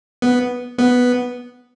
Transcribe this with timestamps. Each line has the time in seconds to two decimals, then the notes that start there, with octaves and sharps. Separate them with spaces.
0.22 B3
0.78 B3